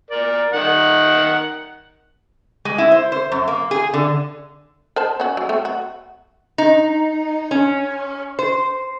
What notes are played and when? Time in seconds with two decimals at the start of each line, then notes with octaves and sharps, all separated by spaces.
0.11 A#4 D5
0.54 D#3 A#4 F#5
2.65 G#3
2.78 E4
2.92 C5
3.12 C5
3.32 F#2
3.48 A#3
3.71 G#4
3.94 D3
4.96 A#4 C5 A5
5.20 C#4 F#4
5.37 F#3
5.49 A3 C4
5.65 F#4
6.58 D#4
7.51 C#4
8.39 C5